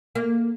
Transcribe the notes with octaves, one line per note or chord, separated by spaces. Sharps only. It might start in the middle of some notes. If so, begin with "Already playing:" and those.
A#3